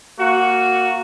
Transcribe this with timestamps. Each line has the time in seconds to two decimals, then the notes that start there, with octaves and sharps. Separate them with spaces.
0.19 A#3 F#4